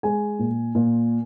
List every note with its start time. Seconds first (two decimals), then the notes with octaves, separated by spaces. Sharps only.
0.03 G#3 G#5
0.39 A#2
0.75 A#2